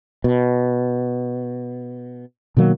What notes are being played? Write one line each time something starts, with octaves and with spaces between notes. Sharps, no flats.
B2
B2 D#3 F#3 A#3